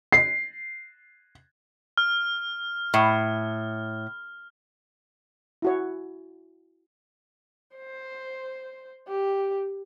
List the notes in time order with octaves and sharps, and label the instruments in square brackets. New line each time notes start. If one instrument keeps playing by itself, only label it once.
[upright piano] C7
[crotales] F6
[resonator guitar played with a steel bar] A2
[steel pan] E4 F#4 C#5
[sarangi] C5
G4